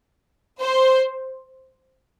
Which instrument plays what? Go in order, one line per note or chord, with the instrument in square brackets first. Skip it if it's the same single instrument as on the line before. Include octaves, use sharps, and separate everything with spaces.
[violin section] C5